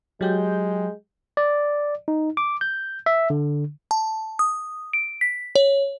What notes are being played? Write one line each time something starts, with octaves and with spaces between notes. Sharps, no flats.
F#3 G#3 G4 G6
D5
D#4
D6
G6
E5
D3
A5
D#6
D7
B6
C#5